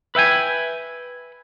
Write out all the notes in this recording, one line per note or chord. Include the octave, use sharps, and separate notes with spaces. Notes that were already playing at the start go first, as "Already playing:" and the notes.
B4 E5 G5 G#5